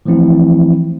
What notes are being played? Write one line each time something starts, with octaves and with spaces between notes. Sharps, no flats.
E3 F3 A3 C4 E4